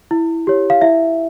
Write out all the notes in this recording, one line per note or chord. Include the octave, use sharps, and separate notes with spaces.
E4
G4 C#5
F5
E4 E5